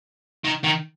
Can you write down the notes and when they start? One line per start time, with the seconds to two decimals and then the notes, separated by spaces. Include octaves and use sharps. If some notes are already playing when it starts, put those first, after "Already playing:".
0.44 D#3
0.64 D#3